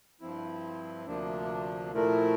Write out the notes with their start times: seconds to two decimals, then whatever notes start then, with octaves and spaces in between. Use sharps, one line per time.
0.21 G2 F3 C4 E4
1.06 D2 C3 F3 A#3 D4
1.91 A#2 F3 A3 E4 A#4